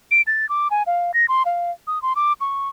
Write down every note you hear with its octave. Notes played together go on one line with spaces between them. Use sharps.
D7
A6
D6
G#5
F5
A#6
C6
F5
D#6
C6
D6
C#6